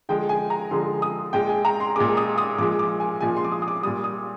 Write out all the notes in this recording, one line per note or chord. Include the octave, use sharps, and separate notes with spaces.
D3 F3 G#3 G5
G#5
A#5
D3 F3 G#3 C6
D#6
A#2 G#3 G5
G#5
A#5
C6
A#2 G#3 D6
D#6
D#6
A#2 F3 G#3 D6
D6
G#5
A#2 F3 G#3 G#5
C6
D6
D#6
D#6
D6
A#2 G3 D#6
D#6